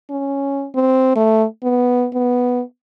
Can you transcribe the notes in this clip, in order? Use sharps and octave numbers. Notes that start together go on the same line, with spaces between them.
C#4
C4
A3
B3
B3